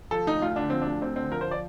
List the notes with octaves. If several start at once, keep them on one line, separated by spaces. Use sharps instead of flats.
F3 A4
D2 D#4
D2 F4
D3 D4
F3 C4
D2 D4
D2 C4
D3 C4
F3 A#4
C5
D5